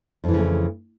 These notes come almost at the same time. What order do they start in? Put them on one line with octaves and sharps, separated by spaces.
F2 E3 C#3 A3